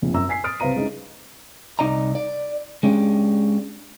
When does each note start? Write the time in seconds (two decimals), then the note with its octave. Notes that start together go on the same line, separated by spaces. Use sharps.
0.02 F1 A#1
0.14 F#2 A#5 E6
0.29 G#5 B6 C7
0.44 D#6 F6 A6 D7
0.60 C2 B4 C5 F5 A#5 D#7
0.76 G#3 C#4 D#4 E4
1.79 C2 D#4 D5 D#5 A#5
2.15 D5
2.83 G#3 C#4 D4 G4